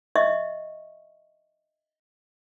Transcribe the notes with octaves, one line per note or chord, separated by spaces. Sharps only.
D#5 E5 C#6